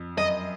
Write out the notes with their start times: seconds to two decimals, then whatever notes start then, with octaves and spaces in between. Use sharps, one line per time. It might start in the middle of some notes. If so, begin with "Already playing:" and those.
Already playing: F2
0.18 F#2 D#5